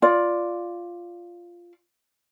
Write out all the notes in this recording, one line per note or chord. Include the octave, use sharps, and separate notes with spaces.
F4 D5